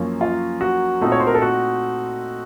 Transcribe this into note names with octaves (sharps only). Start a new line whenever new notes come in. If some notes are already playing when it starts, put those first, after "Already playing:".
Already playing: F#2 F3 A#3 C#4
F4
F#4
A#2 A3 C4 D#4
C#5
C5
A#4
A4
F#4